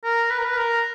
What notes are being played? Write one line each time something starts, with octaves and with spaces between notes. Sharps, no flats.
A#4
B4
A#4
B4
A#4